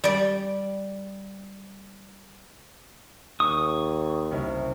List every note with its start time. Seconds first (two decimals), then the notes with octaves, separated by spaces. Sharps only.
0.04 G3 D5
3.40 D#2 C#6 D#6
4.31 F#1 C2